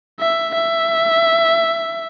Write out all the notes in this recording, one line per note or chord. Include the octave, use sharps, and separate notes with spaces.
E5
E5